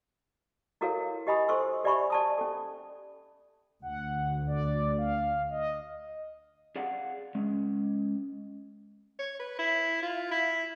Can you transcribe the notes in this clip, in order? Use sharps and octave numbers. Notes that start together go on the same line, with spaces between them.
E4 F#4 A4 A#4 C#5 F5
G4 D#5 G#5 B5 D#6
A4 C5 C6 C#6 E6
G4 D5 E5 G#5 B5 C#6
D5 A5 D#6
C#4 A4
D2 F#5
D5
F5
D#5
G#4 D5 F5 F#5
G#3 C#4
C#5
B4
E4
F4
E4